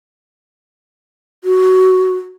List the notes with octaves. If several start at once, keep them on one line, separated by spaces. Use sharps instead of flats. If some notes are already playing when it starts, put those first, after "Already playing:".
F#4